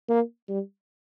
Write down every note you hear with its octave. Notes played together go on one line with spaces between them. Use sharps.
A#3
G3